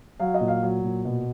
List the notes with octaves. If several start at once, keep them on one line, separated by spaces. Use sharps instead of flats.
F#3 F5
D#5
A#2
F5
F#3
A#2
B2